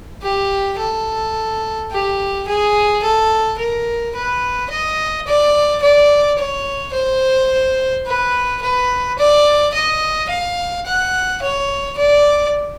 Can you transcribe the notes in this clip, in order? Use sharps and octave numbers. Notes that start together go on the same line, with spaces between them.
G4
A4
G4
G#4
A4
A#4
B4
D#5
D5
D5
C#5
C5
B4
B4
D5
D#5
F5
F#5
C#5
D5